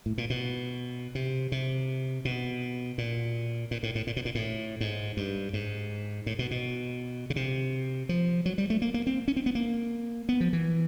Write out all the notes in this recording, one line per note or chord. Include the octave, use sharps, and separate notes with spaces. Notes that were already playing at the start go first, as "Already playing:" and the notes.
A2
A#2
B2
C3
C3
B2
A#2
A#2
A2
A2
A#2
B2
A#2
A2
G#2
G2
G#2
A2
B2
B2
C#3
C3
F3
F#3
G3
A3
A#3
A#3
C4
C#4
C4
B3
A#3
B3
F3
E3